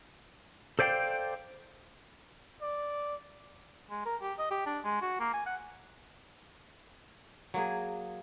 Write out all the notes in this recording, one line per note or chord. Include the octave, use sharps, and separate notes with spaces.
A4 C5 D5 F5 G5
D5
G#3
A#4
G4
D#5
G4
D4
G#3
F#4
A#3
G#5
F#5
F#3 A#3 G#4